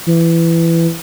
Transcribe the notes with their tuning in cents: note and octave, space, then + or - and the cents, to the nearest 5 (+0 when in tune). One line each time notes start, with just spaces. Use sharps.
E3 +15